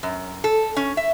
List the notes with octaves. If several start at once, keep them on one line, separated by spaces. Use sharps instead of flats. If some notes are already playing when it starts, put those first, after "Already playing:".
F#2
A4
C#4
E5